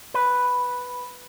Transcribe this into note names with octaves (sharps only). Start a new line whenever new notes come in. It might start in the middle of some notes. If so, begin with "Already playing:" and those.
B4